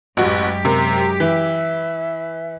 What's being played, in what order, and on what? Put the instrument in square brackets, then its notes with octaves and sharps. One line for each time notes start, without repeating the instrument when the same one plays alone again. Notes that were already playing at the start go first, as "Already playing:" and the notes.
[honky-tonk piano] A1 F#4 [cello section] F#2 G#3 G4
[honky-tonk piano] C3 A#3 [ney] A#5
[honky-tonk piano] E3 [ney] E5